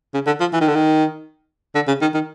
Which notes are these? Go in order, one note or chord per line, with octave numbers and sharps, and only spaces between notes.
C#3
D3
F3
E3
D#3
D3
D#3
D3
C#3
D#3
D#3